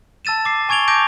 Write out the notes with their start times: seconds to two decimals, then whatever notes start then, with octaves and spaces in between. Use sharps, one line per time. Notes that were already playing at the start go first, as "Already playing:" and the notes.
0.25 A5 E6 A6 D#7 E7
0.45 D6 C7
0.69 G#5 C#6 G#6 D7 F7 G7
0.88 A5 D6 G6 A#6 D7 F7